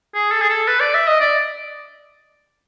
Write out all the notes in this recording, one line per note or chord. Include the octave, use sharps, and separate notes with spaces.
G#4
A4
G#4
A4
B4
D5
E5
D#5
D5